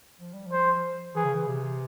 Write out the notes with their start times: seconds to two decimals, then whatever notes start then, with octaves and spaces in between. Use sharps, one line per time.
0.20 F3
0.34 G3
0.46 F3
0.52 C5
1.15 E3 G#4
1.25 C#3
1.35 E3
1.48 C3